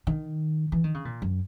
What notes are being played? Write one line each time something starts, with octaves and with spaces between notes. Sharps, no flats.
D#3
E3
D#3
C#3
A#2
F#2